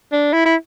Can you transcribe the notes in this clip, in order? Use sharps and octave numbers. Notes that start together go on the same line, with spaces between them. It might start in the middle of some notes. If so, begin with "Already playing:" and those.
D4
E4
E4